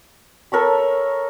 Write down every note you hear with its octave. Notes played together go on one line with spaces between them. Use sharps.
A4 A#4 C#5 B5